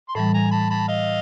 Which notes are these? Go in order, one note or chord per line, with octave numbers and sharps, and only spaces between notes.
C6
A2 E3 G3 A5 B5
G#5 A#5
A5 B5
A5 B5
D#5 F5